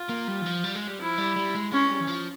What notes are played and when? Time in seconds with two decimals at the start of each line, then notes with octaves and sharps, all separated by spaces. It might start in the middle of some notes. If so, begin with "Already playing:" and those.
Already playing: F4
0.09 A#3
0.28 G3
0.41 E3
0.46 F3
0.64 G3
0.75 G#3
0.88 G3
0.99 F3 E4
1.18 G3
1.36 G3
1.55 G#3
1.72 G#3 C#4
1.91 G3
2.01 E3
2.08 F3